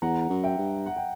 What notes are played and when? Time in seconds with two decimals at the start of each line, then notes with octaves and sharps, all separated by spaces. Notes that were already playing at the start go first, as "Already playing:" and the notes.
0.02 E2 F#5 A#5
0.29 F#2
0.44 E5 G5
0.58 G2
0.86 F#5
0.96 G5